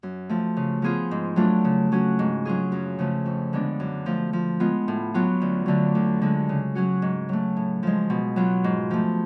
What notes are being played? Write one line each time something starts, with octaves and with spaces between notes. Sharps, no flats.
F#2
F3 A3
C#3
F3 B3 F4 G#4
G#2
F#3 A3 D4 F4
C#3
F#3 C#4 F#4
G#2
F#3 C#4 F4 G#4
F#2
C#3 F3 A3
F2
D3 G#3 B3 D4
F#2
F3 A3
F3
G#3 B3 F4
A2
F#3 B3 F4
D2
D3 F#3 A3 D4
D2
D3 G#3
C#3
F#3 C#4 F#4
G#2
F#3 A3
A2
F3 G#3
B2
F#3 B3 F4
G#2
F3 A3